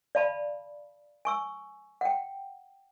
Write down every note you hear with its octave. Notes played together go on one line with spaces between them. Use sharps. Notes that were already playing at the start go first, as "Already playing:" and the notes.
D5 F5 A5 B5
G#5 C#6 E6
F#5 G5